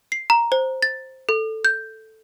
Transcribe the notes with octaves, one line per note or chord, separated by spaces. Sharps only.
C7
A#5
C5
A6
A4
G6